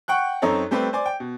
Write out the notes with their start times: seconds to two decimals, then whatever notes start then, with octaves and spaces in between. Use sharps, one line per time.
0.08 F#5 G5 C#6 F#6
0.42 F#2 C4 D#4 A4 C#5
0.71 G3 A3 C4 G4 B4
0.93 C5 D5 G#5 D6
1.06 G5
1.20 B2